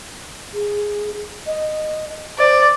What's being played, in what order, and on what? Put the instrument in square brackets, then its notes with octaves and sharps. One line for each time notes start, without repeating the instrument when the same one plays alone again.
[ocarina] G#4
D#5
[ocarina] C5 [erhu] D5